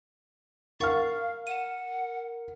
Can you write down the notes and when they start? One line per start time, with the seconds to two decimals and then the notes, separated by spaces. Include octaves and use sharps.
0.80 A#4 F5 F#5 C#6 F6 A6
1.47 F#5 D#7 E7